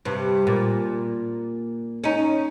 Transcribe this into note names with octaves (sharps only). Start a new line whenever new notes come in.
G2 C3
A#2
C#4 D#4